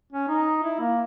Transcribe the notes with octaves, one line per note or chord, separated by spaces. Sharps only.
C#4
D#4
E4
A#3